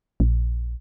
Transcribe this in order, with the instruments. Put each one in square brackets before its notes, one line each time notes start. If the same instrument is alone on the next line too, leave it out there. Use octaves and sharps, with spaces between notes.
[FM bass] A#1